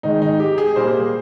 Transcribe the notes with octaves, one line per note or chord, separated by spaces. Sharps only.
G#2 D#3 G#3 D#4
D#4
G4
G#4
A#2 G3 A#3 C5